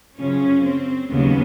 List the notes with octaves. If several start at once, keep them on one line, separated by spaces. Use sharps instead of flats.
F#2 C#3 F3 C#4
C4
D#2 C#3 F#3 B3